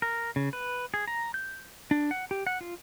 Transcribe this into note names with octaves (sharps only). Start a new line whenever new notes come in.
A#4
C#3
B4
G#4
A#5
G6
D4
F#5
G4
F#5
F4